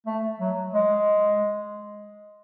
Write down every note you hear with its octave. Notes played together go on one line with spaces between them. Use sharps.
A3
F#3
G#3